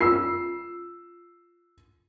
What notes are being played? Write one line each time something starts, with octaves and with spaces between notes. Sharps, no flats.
F4 E6 C7